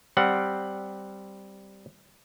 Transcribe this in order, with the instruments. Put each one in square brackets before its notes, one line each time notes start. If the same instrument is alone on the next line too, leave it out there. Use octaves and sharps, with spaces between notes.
[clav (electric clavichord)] G3 C4 F#5